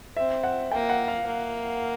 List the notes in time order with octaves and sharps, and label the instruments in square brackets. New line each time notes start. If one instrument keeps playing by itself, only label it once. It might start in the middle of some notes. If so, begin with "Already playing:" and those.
[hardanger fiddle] C4 [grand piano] E5
[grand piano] F#5
[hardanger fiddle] A#3 [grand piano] G5
[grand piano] F#5
F5
[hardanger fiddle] A#3